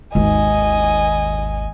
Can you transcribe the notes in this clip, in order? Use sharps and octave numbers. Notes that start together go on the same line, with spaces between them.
G#1 D#2 D#5 G#5